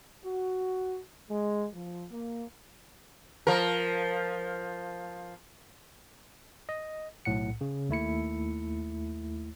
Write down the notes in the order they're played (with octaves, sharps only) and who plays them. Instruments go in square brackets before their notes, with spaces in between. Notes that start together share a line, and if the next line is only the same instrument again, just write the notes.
[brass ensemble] F#4
G#3
F3
A#3
[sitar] F3 A#4
[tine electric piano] D#5
B1 A2 F#5 C#7
C#3
D#2 A3 E4 C#7